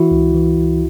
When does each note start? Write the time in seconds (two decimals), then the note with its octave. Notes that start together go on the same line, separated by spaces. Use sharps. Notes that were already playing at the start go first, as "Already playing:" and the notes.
Already playing: E3 E4 F#4
0.11 C#2
0.34 E3
0.58 C#2